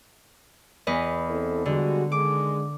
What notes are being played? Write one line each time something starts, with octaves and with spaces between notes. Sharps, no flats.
E2 B4 D#5
C4 E4 A4
D3 G3 G#3 F#4
D3 D#3 G#3 D6